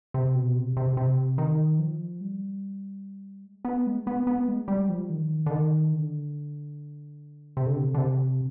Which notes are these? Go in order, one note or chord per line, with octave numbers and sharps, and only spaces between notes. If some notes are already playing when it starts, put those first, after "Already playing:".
C3
B2
C3
C3
C3
D#3
F3
G3
G#3
B3
G#3
B3
B3
G#3
G3
F3
D#3
D3
D#3
D3
C3
D3
C3
D3
C3